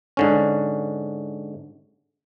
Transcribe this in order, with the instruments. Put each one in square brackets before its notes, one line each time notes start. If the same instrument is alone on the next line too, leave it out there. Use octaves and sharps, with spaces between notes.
[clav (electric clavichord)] G#2 D3 C#4